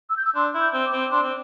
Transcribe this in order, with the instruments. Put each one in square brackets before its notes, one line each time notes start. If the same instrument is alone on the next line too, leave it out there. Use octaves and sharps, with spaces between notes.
[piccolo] E6
G6
E6
[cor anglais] D4 [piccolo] C6
[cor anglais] E4
[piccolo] G6
[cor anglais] C4
[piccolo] D6
[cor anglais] C4
[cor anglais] D4 [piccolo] C6
[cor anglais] C4